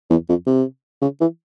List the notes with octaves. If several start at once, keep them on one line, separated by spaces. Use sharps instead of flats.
E2
F2
C3
C#3
E3